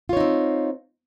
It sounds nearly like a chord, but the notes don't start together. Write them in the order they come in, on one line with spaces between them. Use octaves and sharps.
F4 C#5 D#4 C4